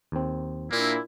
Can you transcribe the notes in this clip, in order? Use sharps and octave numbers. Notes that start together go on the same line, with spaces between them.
D#2 C4
A#2 A#3 D4 E4